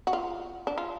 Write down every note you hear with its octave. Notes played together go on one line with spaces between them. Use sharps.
F#4
F4
D4
F4